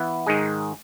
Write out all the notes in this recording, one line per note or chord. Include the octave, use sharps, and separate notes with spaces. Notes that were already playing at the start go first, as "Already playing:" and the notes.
Already playing: E3 B3 E4
G#2 D#3 G#3 D#4 G#4